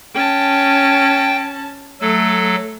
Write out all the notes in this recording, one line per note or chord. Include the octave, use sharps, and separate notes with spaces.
C#4 G5 A5
F#3 A3 A4